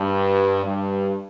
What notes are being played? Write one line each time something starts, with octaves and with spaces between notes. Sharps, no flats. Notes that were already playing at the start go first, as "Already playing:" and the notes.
Already playing: G2
G2